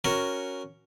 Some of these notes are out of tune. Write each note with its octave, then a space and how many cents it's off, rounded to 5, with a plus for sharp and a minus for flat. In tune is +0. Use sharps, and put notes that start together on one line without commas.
C#4 +0 F#4 +0 A#4 +0